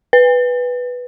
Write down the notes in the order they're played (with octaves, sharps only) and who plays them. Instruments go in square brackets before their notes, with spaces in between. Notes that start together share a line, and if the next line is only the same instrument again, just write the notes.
[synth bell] B4